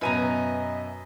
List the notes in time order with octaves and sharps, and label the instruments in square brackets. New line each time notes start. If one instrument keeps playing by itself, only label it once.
[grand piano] F#2 B2 [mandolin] B4 G#5 A#5 [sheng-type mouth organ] D#5 E5